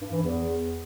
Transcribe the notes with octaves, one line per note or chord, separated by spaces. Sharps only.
G2
E3
E2